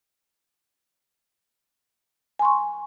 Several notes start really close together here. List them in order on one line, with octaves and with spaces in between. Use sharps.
G#5 C6 C#6